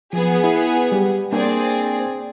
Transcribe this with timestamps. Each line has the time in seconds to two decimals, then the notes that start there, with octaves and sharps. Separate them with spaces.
0.13 F3 B3 G#4
0.44 E4
0.92 G3 G4
1.32 A#3 C4 D4 G#4 D5